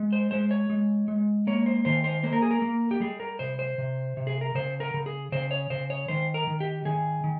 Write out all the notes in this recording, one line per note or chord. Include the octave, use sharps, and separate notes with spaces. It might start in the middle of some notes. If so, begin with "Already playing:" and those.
Already playing: G#3
C5
G#3 C5
C#5
G#3
G#3
A#3 C#5
C5
D#3 C5
C5
A#3 C5
A#4
G#4
A#4
A#3
G4
G3 G#4
A#4
C3 C5
C5
C3
C3
G#4
A#4
C#3 C5
A#4
C#3
G#4
C#3 C5
C#5
C#3 C5
C#5
D#3 C5
A#4
D#3
G4
D#3 G#4
D#3